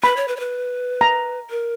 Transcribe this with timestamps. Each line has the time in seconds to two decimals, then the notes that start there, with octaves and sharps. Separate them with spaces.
0.03 B4 B5
0.17 C#5
0.28 B4
0.37 C#5
0.40 B4
1.01 A#5
1.50 A#4